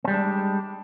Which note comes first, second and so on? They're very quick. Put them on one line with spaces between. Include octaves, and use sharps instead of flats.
C4 G3 G#3 D4